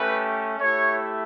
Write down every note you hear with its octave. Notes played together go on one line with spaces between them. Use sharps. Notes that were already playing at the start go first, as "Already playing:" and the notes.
Already playing: A3 C#4 G4 B4
A3 E4 G4 C#5